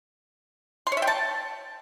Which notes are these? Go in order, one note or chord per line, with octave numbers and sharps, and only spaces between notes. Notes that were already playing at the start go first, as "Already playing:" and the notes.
C6
C#5
E5
G5
A5